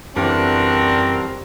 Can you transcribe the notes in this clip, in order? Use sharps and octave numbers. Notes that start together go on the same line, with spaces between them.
F#2 D3 E3 G3 C4 D4 F#4 A#4